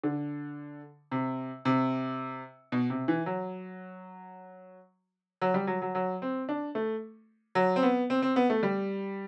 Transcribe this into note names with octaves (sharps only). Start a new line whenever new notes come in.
D3
C3
C3
B2
C3
E3
F#3
F#3
G3
F#3
F#3
F#3
C4
D4
A3
F#3
C4
B3
C4
C4
B3
A3
G3